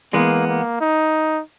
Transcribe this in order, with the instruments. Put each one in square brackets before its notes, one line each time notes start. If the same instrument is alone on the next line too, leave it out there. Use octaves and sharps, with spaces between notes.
[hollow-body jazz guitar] E3 G#3 B3 [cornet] A#3
[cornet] A#3
D#4